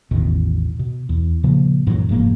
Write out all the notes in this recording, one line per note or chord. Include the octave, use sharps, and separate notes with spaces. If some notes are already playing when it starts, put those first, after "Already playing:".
A1 E2 B2 D#3
B2
E2
A#2 C#3 F3 A#3
F#2 A#2 E3 F#3
F1 G#2 F3 A#3